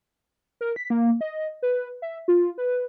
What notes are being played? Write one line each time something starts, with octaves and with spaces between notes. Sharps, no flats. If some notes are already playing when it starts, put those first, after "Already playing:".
A#4
B6
A#3
D#5
B4
E5
F4
B4